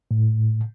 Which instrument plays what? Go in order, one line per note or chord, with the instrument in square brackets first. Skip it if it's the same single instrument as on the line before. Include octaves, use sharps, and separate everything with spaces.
[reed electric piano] A2